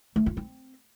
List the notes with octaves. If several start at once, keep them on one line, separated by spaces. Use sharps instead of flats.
A3
F4
C4